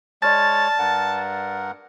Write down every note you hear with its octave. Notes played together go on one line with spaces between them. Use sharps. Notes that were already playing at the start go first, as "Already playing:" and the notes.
G#3 C#5 D5 A5 F6 A6
G2 A#4 F#5